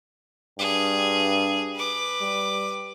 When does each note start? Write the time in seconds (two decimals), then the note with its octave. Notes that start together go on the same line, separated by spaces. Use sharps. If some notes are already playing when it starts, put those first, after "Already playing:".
0.59 G2 G#4
1.75 B4 D6
2.21 G3